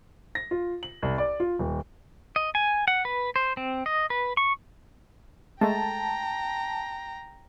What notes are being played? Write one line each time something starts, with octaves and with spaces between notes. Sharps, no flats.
A#6
F4
F#7
C2
D5
F4
D#1
D#5
G#5
F#5
B4
C5
C4
D#5
B4
C#6
G#3 A3 G5 A5 A#5